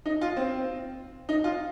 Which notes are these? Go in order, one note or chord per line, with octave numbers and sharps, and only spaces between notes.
D#4
F4
C4
D#4
F4